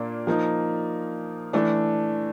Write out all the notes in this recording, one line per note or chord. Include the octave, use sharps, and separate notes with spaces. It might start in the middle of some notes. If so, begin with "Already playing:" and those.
Already playing: A#2 A#3 D4
F3 A#3 D#4
E3 A3 D4